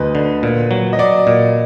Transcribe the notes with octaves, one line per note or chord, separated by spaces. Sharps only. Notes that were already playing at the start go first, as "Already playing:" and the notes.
Already playing: D2 B4 D#5
D3
A#2
F#3
D#5
F#3 D5
A#2